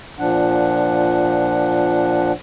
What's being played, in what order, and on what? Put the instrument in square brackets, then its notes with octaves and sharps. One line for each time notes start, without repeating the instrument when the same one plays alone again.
[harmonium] A#2 F3 D4 F#5